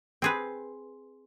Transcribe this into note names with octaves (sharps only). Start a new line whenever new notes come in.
C4 G#4 B4